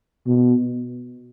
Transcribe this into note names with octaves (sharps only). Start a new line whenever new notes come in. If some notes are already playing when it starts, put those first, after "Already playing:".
B2